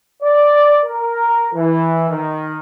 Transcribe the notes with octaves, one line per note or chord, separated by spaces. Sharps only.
D5
A#4
E3
D#3